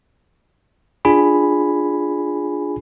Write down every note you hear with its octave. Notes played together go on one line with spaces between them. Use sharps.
D4 F4 G#4 G#5 B5